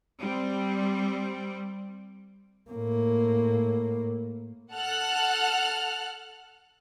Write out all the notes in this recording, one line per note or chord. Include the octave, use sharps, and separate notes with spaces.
G3 C4
A2 A#3
A4 F#5 F6 F#6